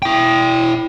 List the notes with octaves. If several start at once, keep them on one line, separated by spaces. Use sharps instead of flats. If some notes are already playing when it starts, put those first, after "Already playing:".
E4 G5